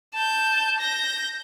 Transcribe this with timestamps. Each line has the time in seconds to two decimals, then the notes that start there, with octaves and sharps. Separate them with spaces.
0.14 A5 G6
0.80 G6 A#6